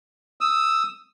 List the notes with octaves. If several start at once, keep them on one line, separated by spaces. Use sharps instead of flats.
D#6 E6